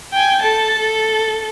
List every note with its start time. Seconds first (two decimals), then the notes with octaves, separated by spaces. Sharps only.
0.13 G5 G#5
0.42 A4 A5
0.78 A4